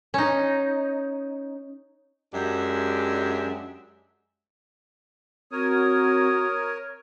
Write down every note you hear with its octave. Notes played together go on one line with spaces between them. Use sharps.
C#4 D#4
F#2 G#3 D4 G4 E5
C4 F#4 A#4 C#5 D#6